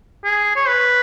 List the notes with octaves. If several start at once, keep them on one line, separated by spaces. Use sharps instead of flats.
G#4
C#5
B4